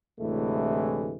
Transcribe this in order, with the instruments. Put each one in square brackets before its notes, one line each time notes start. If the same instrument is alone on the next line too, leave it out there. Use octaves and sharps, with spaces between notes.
[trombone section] D2 A2 C3 E3 G#3 A3